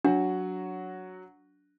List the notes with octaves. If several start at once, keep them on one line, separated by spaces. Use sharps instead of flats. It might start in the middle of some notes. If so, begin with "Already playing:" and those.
F#3 D4 F#4